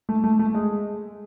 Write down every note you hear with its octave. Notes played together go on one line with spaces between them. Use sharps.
A3
A3
A3
G#3